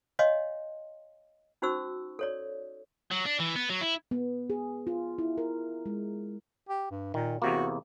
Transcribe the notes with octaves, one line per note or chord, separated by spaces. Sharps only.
C#5 D#5 F5 G#5 C6
C#4 D#4 F#4 C5 C#6 E6
A4 C#5 D5
F#3
D4
E3
B3
F#3
E4
B3
G#4
F4
E4
A#4
G#3
G4
G2
A#2 D#3
E2 C3 A#3 F#4